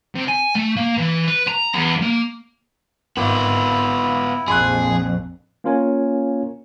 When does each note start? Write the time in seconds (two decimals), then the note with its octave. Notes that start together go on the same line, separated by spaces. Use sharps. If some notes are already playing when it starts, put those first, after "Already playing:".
0.15 C3
0.28 G#5
0.55 A3
0.76 A#3
0.98 E3
1.28 B4
1.47 A#5
1.74 E2
2.02 A#3
3.17 G#1 B3 E4 F4
4.48 A#1 F2 G#4 B5 C6 F#6
5.64 A#3 C#4 F4 A#4 C#5 G#5